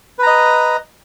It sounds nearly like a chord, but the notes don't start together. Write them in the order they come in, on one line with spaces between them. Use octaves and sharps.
B4 A#5 D#5